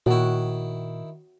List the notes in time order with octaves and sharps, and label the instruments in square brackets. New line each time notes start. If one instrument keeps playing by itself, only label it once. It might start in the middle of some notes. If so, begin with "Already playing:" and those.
[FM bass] A#2 [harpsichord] D#3 E4 [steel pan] F#4 G5